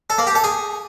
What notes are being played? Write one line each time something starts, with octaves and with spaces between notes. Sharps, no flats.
A4
A#3
G4
A4
G#4